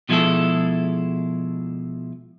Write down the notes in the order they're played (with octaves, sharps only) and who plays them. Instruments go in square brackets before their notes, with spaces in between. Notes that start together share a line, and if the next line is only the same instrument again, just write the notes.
[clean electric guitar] B2 F3 G#3 E4 G#4 A4